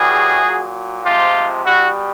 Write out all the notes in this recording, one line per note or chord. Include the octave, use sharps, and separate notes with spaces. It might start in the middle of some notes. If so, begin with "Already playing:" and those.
Already playing: A2 E3 G3 F#4 G#4
A#2 F#3
C3 F3 G#3 F4 G4
B2 G3 E4 F#4